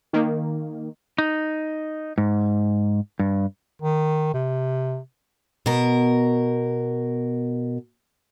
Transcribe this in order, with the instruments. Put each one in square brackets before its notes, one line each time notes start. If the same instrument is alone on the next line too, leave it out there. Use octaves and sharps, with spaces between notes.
[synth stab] D#3 A#3
[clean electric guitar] D#4
G#2
G2
[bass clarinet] D#3
C3
[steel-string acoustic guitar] B2 A#4